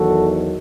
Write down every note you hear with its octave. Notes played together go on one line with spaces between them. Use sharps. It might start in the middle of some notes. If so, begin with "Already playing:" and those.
Already playing: E2 D#3 F#3 F#4 A4